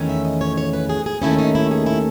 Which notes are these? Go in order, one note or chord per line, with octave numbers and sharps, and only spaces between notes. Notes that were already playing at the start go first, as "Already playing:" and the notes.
Already playing: E2 D#3 A3 C#4
E5
D#5
C#5
C#5
B4
G#4
G#4
D#2 D#3 A3 C#4 E4
D#4
E4
G#4
E4